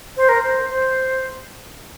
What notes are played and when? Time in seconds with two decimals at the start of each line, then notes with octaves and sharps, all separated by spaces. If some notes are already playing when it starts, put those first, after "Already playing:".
0.17 C5
0.29 A#4
0.42 C5
0.69 C5